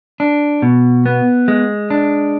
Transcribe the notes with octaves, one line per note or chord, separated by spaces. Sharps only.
D4
B2
B3
G#3
D4